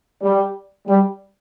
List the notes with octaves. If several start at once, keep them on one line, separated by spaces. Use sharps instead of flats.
G3
G3